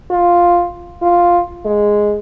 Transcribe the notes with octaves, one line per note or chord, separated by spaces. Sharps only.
F4
F4
G#3